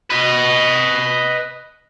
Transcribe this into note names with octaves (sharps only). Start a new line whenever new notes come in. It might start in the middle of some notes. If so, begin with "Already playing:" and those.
B4 D#5